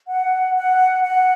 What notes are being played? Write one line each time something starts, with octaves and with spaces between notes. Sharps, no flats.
F#5
F#5
F#5